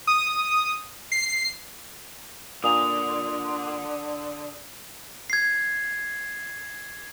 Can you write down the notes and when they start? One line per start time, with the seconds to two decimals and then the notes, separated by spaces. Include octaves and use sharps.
0.07 D#6
1.12 C7
2.64 A#2 D3 D#6 F7
5.30 G#6 C7